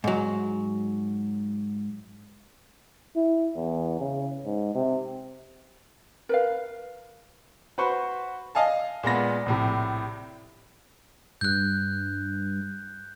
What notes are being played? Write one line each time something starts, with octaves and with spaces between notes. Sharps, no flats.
G#2 F#3
E4
E2
C#3
G#2
C3
A#4 B4 F5
F#4 B4 C5 C#6
D#5 F5 G#5 A5
A#2 G#3 B3 A#6
A#1 A2 C3
G2 F#6 G6